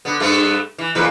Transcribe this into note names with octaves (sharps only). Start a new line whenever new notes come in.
D3 B3
G2 A3 B3
E3
E2 A#2 B4